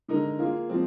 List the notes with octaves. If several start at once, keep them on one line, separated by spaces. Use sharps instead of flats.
D3 G#3 D#4 A#4
A#3 F4 G#4
F3 G#3 C4